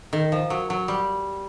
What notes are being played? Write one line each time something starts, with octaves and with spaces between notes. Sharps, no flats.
D#3
F3
F#3
F#3
G3